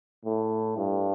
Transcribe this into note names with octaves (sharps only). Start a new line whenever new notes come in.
A2
G2